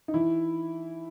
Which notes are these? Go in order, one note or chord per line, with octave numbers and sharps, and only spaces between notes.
D#4
E3 E4